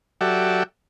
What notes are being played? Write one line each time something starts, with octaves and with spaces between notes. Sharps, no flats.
F#3 F#4 G4 A4 D5 E5